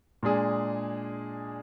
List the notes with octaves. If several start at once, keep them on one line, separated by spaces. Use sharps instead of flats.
A#2 G#3 D4 G#4